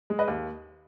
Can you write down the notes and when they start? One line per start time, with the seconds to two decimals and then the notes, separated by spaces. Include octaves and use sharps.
0.10 G#3
0.19 B4 D#5
0.28 D#2